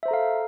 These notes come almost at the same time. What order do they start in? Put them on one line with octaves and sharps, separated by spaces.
E5 C5 A#5 A4 F5